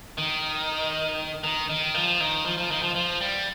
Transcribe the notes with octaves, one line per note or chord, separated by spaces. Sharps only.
D#3
D#3
D#3
F3
D#3
F3
F3
D#3
F3
F3
G3